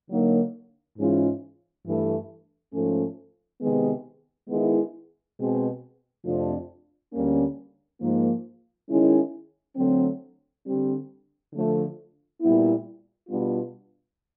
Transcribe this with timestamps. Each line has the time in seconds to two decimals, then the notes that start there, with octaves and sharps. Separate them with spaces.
0.09 D3 F#3 A#3 D#4
0.98 G#2 E3 G#3 C#4 F4
1.85 G2 E3 A3
2.73 G#2 F3 A3 C#4
3.61 C3 D#3 G#3 B3
4.49 D#3 G#3 B3 E4
5.37 B2 G#3 C4
6.24 F2 C3 F3 A3 D4
7.14 D2 D3 G3 A#3 C#4
8.01 G#2 F3 A#3
8.89 D#3 G#3 C#4 E4
9.76 D3 F#3 A3 C4
10.64 D3 G3 C4
11.52 D3 F3 A3
12.41 A#2 G3 B3 E4
13.29 B2 G3 B3 D4 F4